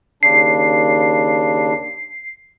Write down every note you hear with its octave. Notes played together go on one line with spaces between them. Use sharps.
D#2 C#3 D4 C7